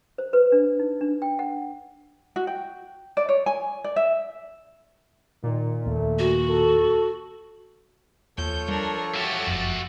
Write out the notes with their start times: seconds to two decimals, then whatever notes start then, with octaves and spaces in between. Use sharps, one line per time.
0.18 C5
0.33 B4
0.52 D4
0.79 D#4
1.01 D4
1.22 G5
1.39 F#5
2.36 F#4
2.47 G5
3.17 D5
3.29 C#5
3.46 G#5
3.84 D5
3.96 E5
5.43 A#2 D#3
5.87 D#2 A3
6.19 F#4
6.49 A4
8.38 D#2 F3 A4 C#5 G6
8.68 G3 D4 A#4
9.16 F#4 G4 E5 A6
9.47 F#1 F2